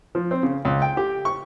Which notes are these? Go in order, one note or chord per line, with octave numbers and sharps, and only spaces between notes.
F3
C4
C#3
C#2
G5
G4
C#6